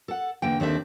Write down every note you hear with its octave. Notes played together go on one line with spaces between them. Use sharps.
A4 F#5
E2 D3 A#3 G5
D#2 D#3 C4 D4 A4 E5